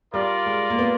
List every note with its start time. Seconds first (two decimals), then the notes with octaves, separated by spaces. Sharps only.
0.14 G3 F4 A#4 D5
0.46 G#3
0.70 A#3
0.79 B3